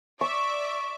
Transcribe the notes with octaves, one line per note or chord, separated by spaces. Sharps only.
D5 E5 C#6 D6